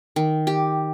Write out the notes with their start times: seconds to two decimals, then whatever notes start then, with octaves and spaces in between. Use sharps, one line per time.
0.16 D#3
0.47 G4